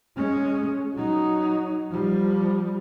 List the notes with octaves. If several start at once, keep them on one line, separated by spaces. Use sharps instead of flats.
G#3 C#4
F#3 D#4
F3 G3